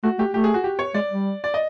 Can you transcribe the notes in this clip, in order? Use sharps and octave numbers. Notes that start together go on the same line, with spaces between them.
A3 F#4
A3 G4
A3 G4
G#4
F#4
G4
C#5
G#3 D5
G3
D5
D#5